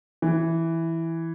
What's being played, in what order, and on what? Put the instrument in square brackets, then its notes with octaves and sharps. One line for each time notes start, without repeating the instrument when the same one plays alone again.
[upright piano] E3